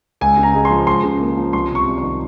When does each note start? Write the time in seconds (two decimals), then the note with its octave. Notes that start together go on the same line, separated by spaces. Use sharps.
0.21 C#2 G#5
0.37 C#3
0.43 A#5
0.54 G#3
0.65 C6
0.71 F3
0.87 C#2 C6
1.04 C#3
1.20 A#3
1.37 F3
1.53 C2 C6
1.70 C3 C#6
1.87 C2
1.98 C#6
2.03 D#3